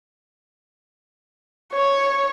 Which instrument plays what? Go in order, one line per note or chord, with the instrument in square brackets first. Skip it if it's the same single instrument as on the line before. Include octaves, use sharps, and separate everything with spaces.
[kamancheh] C#5